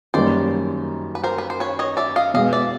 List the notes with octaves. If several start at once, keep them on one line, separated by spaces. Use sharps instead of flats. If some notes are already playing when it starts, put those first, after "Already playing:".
F#2 D#3 G3 A#3 D#4 C5 D5
B4
A#4 C5
B4
C5
B4 C#5
C#5 D#5
D5 E5
D#5 F5
B2 G#3 B3 D#5 F5
D5 E5